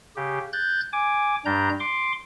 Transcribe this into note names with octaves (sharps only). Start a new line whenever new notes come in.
C#3 G4
F#6 G6 A6
G#5 D6
G2 G3 D4 A#5 G6
C6 D6